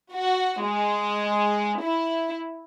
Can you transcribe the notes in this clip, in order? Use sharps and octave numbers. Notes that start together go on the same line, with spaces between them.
F#4
G#3
E4